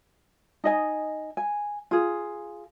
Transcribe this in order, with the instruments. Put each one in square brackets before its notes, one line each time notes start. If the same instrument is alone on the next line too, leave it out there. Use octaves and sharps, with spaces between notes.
[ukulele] D#4 D#5 G#5
G#5
F4 G#4